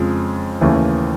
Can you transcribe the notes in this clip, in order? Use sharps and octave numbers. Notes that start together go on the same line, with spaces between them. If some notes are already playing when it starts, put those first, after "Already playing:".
Already playing: F2 C#3 F3 G#3
D#2 C#3 E3 A3